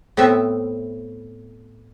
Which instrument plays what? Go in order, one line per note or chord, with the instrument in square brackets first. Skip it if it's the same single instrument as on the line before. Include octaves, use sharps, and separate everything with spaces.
[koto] A2 B3 C4 E5